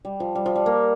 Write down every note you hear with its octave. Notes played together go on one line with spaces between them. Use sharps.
G3
F3
G3
F3
G3
A#3